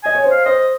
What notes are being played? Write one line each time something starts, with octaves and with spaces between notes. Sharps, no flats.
D#5 G#5
C#5
C5
F5
C5 D#5